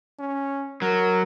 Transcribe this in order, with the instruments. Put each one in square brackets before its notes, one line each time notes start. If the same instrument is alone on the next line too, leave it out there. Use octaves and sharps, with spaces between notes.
[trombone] C#4
[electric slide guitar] F#3 [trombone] A#4